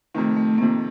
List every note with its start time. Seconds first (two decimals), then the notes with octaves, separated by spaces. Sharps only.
0.15 F2 C3 D#3 A3
0.37 A3
0.58 F2 C3 D#3 A#3